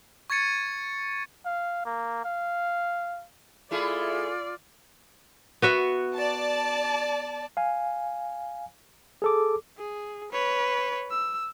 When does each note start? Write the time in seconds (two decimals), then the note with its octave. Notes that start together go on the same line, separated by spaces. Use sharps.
0.30 C#6 G#6 A6 C#7 D#7
1.45 F5
1.85 A#3
2.25 F5
3.71 A3 E4 F4 G#4 D5
5.62 B3 F#4 E5
6.17 D5 A5
7.57 F5 G#5
9.22 G#4 A4 D6
9.78 G#4
10.32 B4 C#5
11.10 E6